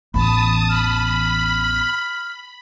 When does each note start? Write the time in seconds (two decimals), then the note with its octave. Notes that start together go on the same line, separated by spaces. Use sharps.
0.14 A1 E2 A5 B5 D#6
0.69 B5 F6